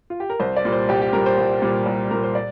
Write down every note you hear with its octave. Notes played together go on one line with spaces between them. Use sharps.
F4
G4
A#4
C2 C5
D5
A#2 G3
C5
C2 G4
G4
A#2 G3 A#4
C5
C2
A#2 G3
C2
A#2 G3 A#4
C5
D5